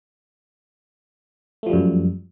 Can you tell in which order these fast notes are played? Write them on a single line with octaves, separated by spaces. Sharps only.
A3 F3 G3 F#2